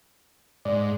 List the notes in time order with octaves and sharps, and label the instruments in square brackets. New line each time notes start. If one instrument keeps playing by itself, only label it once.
[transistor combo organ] G#2 [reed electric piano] D5